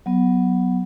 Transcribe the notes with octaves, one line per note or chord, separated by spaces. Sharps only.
F#3 B3